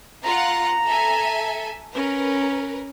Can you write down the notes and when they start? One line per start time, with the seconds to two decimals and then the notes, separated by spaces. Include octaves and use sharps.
0.23 F4 F#5 A#5
0.86 A4 E5 G#5
1.94 C#4 A#4 B4